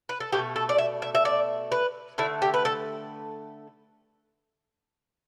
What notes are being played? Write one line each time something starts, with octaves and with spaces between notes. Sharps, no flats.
B4
A4
B2 A3 G4
A4
D5
E5
E5
E5
D5
B4
D3 A3 E4
G4
B4
A4